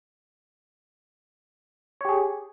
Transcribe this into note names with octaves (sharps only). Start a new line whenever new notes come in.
G4 G#4 C#5